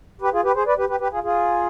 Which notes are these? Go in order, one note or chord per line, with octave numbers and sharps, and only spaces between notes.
G4 B4
F4 G#4
G4 B4
G#4 C5
B4 D5
G4 B4
G4 B4
G4 B4
F4 G#4
F4 G#4